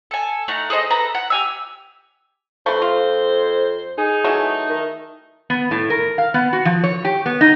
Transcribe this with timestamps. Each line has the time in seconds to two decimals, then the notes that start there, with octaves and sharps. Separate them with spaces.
0.11 A4 G#5
0.48 A3 D#4 F#5
0.70 G#4 A4 C5 D#5
0.90 A4 B4 A#5
1.15 F#5
1.30 G4 G#5 E6
2.66 F2 A3 B4 C5
2.82 F4
3.98 D#4 G#4
4.24 E3 F#3 A3
4.69 D#3
5.50 B3
5.71 A2
5.90 A#4
6.18 F5
6.34 B3
6.53 F#4
6.65 F3
6.83 C#5
7.05 G4
7.26 B3
7.41 D#4